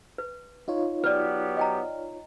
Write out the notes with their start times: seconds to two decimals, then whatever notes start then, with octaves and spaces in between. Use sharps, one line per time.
0.18 B4
0.68 D#4 F4 C#5
1.04 F#3 B3 G4 B4 D5 F6
1.57 D#5 G5 A#5